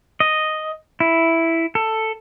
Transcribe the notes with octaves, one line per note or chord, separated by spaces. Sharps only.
D#5
E4
A4